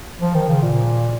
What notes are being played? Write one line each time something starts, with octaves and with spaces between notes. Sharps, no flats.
F3
D#3
C#3
A#2